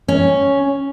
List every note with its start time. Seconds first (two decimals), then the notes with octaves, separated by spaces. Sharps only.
0.08 C#4